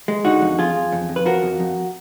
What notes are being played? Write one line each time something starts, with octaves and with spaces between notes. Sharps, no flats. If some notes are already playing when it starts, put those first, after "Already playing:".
G#3
D3 D#4 F#4
F2
F2 F4 G#4
F2
F2
F2
B4
F3 F#4 A#4
F2
F2